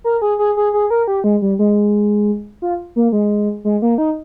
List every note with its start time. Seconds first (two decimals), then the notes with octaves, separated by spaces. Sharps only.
0.04 A#4
0.22 G#4
0.39 G#4
0.57 G#4
0.73 G#4
0.90 A#4
1.08 G4
1.24 G#3
1.42 G3
1.59 G#3
2.62 F4
2.96 A#3
3.12 G#3
3.65 G#3
3.82 A#3
3.98 D#4